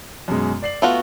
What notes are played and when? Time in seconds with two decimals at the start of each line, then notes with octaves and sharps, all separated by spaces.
0.28 F#2 B2 G#3
0.62 D5 C7 F#7
0.82 A3 B3 F4 F#4